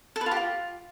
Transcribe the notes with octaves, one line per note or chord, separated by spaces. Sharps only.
A4
B4
F4
G4
F4